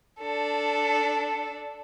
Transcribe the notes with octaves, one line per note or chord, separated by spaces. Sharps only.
D4 A4